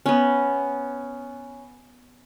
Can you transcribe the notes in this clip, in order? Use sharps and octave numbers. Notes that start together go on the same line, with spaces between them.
B3 C#4